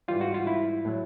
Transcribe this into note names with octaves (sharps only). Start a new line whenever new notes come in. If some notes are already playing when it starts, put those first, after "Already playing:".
G#2 E3 G3 F4
F#4
F4
E4
A2 F#3 A3